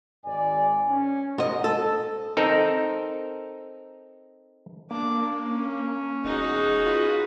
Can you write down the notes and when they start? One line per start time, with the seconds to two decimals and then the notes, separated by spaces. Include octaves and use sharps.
0.24 G#1 G#2 D5 G#5
0.88 C#4
1.38 G#2 D#5
1.64 A4
2.37 C4 D#4 A4 A#4
4.91 A#3 D4 D6
5.45 C#4
6.24 E1 D#4 F#4 G#4
6.86 F4 B4